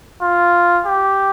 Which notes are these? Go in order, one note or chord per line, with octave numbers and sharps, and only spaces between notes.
F4
G4